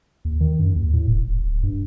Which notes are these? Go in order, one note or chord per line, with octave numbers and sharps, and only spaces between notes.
D#2
D#3
F#2
D#2
A2
D#1
D1
D1
G2